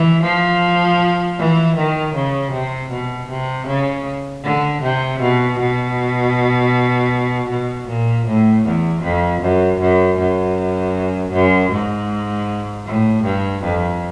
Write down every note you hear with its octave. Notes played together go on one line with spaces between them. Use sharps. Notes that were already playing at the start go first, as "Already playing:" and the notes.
Already playing: E3
F3
E3
D#3
C#3
C3
B2
C3
C#3
D3
C3
B2
B2
B2
A#2
A2
E2
F2
F#2
F#2
F#2
F#2
G#2
A2
G2
F2